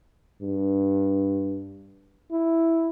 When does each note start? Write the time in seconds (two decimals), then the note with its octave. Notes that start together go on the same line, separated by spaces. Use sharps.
0.42 G2
2.31 E4